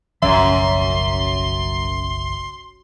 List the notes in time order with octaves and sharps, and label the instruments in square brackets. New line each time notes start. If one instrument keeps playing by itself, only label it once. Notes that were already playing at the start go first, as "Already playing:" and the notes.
[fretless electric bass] F#1 B1 F3 [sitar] F#2 [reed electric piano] E5 [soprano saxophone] C6